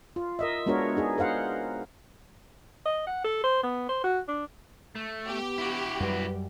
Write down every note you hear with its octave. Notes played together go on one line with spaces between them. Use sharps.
F4
A#4 D#5 E5
G#3 B3 D4 F#4 A#4 C#5
D#4 G#4
A#4 C5 F5 F#5
D#5
F#5
A4
C5
B3
C5
F#4
D4
A3
B3 G4
E4 F#4
F#2 G3 B4